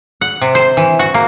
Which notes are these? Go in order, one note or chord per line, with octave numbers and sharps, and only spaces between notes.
F#5
C3
C5
E3
F#4
A#3